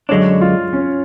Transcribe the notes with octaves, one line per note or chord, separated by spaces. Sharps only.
F#2 D3 G#3 D4 C#5
F4
C#4